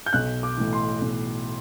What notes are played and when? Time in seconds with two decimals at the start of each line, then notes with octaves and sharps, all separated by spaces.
0.06 G6
0.13 B1 F#6
0.43 D6
0.57 A2 E3
0.73 C6
1.02 B1